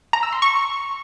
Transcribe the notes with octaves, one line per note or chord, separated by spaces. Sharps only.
A#5
E6
C6
C#6